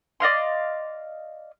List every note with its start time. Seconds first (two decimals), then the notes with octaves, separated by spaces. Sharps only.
0.20 D5 D#5 F5 C6